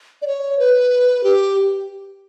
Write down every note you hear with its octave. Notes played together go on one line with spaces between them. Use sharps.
D5
C#5
B4
G4